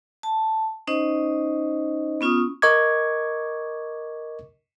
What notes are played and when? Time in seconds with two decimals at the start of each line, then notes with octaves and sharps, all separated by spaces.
0.23 A5
0.87 C#4 D#4 C5 D#5
2.21 B3 C#4 F4 C#6 D#6
2.62 A#4 D#5 C#6 D6 G#6